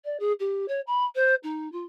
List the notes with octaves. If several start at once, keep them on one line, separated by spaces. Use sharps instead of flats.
D5
G#4
G4
C#5
B5
C5
D#4
F4